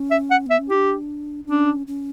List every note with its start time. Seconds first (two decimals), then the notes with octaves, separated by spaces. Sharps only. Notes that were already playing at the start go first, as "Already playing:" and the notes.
Already playing: C#4
0.11 E5
0.31 F#5
0.46 B3 E5
0.59 C#4
0.70 E4 G4
0.74 D4
1.47 C#4 D4
1.87 C#4